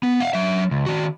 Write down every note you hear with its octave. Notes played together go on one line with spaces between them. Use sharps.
B3
F5 F#5
F#3 E5
C#2
D#3 F#4